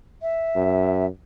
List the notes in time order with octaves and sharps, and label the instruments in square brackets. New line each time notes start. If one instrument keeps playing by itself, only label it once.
[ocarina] E5
[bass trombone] F#2